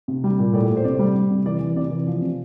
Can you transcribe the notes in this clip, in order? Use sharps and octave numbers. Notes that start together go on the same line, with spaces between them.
C3
G3
A#2
A2 D5
A2
C5
C3 D5
G3
G3
C3
E3 D5
E3
C3 D5
E3
F3
C3